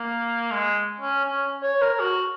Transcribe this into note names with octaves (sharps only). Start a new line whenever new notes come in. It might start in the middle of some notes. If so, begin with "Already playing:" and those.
Already playing: A#3
G#3
C#4
C#4
C#5
A#4
F#4